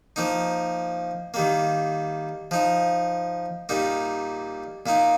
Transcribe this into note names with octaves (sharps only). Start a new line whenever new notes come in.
F3 A#3 D#4
D#3 G3 A#3
F3 D#4
A#2 G3 A#3 D#4
A#2 A#3 D#4